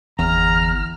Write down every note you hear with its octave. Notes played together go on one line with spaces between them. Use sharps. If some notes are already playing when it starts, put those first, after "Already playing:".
G1 E2 A#5 F6